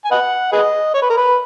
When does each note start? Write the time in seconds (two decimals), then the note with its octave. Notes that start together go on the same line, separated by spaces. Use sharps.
0.05 G#5
0.11 B4 D#5 F#5
0.53 G#4 B4 D#5
0.94 C#5
1.02 B4
1.10 A#4
1.17 B4